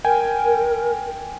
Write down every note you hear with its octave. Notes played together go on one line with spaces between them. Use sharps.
A#4 G5 G#5